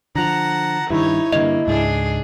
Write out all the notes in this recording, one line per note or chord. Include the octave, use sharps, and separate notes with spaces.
D3 F3 F#5 A5 A#5
G2 D#3 D#4 E4 C#5
G2 D3 A#3 D#5
C#2 G#2 D4 G#4